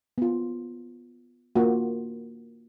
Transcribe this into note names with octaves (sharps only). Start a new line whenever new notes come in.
B3 F4
A#3 D4 F4 F#4